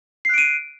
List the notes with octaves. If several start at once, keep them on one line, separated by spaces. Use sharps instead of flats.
F#6 C7 D7 D#7